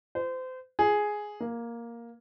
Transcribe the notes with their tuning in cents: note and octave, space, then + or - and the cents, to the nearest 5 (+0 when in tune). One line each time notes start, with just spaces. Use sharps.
C5 -30
G#4 +5
A#3 +5